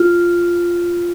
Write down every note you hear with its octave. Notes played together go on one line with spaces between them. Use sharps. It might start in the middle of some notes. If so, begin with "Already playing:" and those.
Already playing: F4